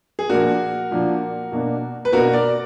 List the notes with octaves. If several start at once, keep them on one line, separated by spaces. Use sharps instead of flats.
G#4
A#2 F3 A#3 D4 F#4 A#4
A#2 F3 A#3 D4
B2 A#3 D4
B4
B2 A#3 D4 F#4 A#4
A#4 D5